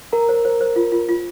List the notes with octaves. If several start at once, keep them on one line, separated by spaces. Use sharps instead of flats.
A#4 A#5
C5
C5
C5
F4
F4
F4